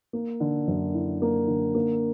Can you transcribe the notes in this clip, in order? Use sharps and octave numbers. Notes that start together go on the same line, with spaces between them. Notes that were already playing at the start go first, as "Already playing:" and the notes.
A#3
D3
F#2
E4
A#3
D3
A#3